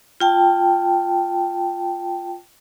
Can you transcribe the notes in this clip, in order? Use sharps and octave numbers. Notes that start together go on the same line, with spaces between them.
F4 G5 A5